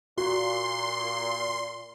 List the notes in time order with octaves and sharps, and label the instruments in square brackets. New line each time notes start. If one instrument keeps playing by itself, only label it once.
[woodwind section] A#2 [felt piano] F#4 [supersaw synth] C6